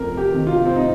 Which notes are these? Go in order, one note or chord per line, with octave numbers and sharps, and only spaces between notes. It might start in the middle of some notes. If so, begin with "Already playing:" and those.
Already playing: F2 C3 A#4
G4
C3 D#3
F4
C4
D#4